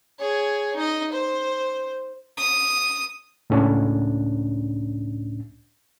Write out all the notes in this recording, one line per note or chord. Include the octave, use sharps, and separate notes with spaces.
G#4 C#5
D#4 D#5
C5
D#6
C#2 A2 C#4 D4